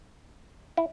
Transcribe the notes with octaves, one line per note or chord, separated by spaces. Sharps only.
E4